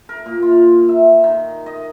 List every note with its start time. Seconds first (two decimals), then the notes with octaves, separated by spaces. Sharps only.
0.09 A#4
0.26 A#2
0.42 F4
0.88 E5
1.24 D#3
1.66 D#5